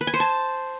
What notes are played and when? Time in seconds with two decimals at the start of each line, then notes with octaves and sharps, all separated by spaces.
0.01 B4
0.07 G#5
0.14 C5
0.20 A5